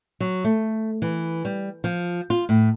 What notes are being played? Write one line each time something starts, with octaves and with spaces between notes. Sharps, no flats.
F#3
A3
E3
G3
F3
F4
A2